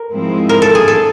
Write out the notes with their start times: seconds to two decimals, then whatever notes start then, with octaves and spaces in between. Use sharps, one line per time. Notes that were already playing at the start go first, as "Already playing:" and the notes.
Already playing: A#4
0.11 G#2 F3 G#3 C4 E4
0.49 A#4
0.62 A4
0.75 G#4
0.88 A4